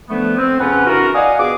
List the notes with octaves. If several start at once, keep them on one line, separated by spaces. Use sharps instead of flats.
D3 F3 A3 B3
C4
F2 C#3 C#4 F4 B4 F#5
E3 D4 F#4 A#4
D5 D#5 F5 F#5 G#5 D#6
B2 F4 G#4 D6